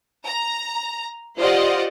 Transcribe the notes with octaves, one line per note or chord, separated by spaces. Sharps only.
A#5
F4 G4 C5 D5 D#5 F#5